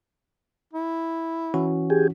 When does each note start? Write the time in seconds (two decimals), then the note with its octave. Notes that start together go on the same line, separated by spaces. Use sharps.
0.73 E4
1.54 E3 C#4 F#4
1.90 G4 G#4